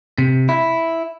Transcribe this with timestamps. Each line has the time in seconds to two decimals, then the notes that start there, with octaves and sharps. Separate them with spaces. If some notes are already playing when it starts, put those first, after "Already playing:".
0.18 C3
0.49 E4